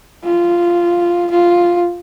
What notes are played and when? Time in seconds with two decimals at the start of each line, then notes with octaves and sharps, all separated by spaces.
0.25 F4
1.31 F4